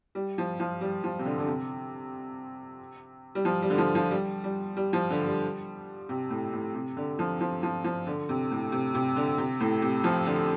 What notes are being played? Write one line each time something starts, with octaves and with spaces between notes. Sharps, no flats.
G3
F3
F3
G3
F3
C3
D3
D3
C3
G3
F3
G3
D3
F3
F3
G3
G3
G3
F3
D3
G3
C3
A2
A2
C3
D3
F3
F3
F3
F3
D3
C3
A2
C3
C3
D3
C3
A2
C3
F3
D3